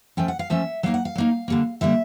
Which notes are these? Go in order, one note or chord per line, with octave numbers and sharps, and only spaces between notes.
F3 A3 C#4 G5
F#5
F5
F3 A3 C#4 E5
F#3 A#3 D#4 F5
F#5
F5
F#3 A#3 D#4
D3 G3 A#3
D3 G3 A#3 E5